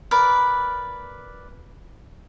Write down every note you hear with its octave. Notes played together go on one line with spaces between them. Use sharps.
A#4 B4 D5